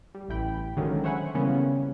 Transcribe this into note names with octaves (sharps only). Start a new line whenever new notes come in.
G3
A1 E3 G5 B5
D3 D#3 F#3 G#3 A3 C#4
C5 C#5 E5 F#5 G#5 B5
C#3 E3 G3 A#3 B3 C#4